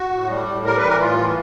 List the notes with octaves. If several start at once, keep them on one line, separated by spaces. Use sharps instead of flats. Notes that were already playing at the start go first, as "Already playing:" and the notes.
Already playing: F#4
A2
G3
A2
G3 A#4
B4
E3 A#4
A2 F4
E3